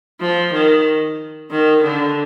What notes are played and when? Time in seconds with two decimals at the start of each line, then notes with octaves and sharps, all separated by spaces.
0.21 F3
0.53 D#3
1.51 D#3
1.83 D3